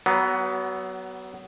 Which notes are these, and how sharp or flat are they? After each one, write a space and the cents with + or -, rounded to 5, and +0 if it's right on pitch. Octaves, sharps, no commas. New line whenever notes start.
F#3 +30 B3 +0